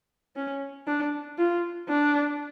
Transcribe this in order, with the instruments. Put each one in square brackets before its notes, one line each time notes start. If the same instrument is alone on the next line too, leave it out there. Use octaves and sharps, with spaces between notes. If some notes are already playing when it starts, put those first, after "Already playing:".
[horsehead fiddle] C#4
D4
F4
D4